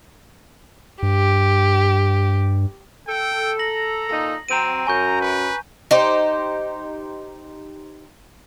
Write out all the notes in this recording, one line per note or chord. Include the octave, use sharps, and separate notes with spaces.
G2 G4
A4 G5
A#5 A#6 F#7
A#2 D#4 A4
F#3 C4 A#5 D#7
F#2 G#5 A#5 C#6 G6
B4
D#4 G4 C5